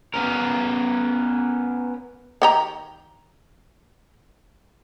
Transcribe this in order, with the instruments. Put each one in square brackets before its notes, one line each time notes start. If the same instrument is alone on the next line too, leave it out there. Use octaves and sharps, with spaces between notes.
[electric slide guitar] B3 C#4 A#4
[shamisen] D#3 G4 A#5